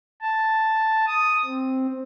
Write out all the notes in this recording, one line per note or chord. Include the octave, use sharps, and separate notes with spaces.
A5
D#6
C4